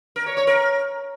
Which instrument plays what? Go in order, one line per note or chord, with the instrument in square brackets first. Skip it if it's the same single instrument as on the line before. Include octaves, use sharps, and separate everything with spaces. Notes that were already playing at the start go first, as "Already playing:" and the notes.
[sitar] A#4
C#5
C#5
A#4